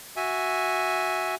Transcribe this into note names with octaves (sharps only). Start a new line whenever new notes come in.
F#4 E5 G#5